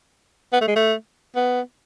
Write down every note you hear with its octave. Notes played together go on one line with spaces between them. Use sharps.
B3
A3
G#3
A3
B3